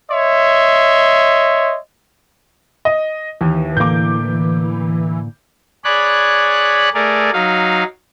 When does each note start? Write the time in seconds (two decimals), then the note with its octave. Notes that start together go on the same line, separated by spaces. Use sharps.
0.11 C#5 D#5 E5 C6
2.85 D#5
3.41 D#2 E3
3.77 A2 D3 A#3 D6 G6
5.84 G#4 C#5 D5 B5 F#6
6.94 A3 G#4 A#4 D5
7.33 F#3 D#4 F5